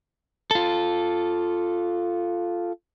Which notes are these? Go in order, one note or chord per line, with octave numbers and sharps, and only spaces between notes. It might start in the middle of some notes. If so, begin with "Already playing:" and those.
F4 A4